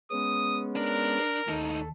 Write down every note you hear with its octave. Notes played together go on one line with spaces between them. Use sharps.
G#3 B3 C#4 D#6
D4 A#4
D#2 A2 D#4 A4